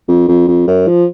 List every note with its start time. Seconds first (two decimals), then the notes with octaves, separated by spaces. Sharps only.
0.08 F2
0.28 F2
0.48 F2
0.68 F#2
0.87 F3